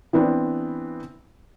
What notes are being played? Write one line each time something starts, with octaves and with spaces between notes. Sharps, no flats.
E3 B3 C4 D4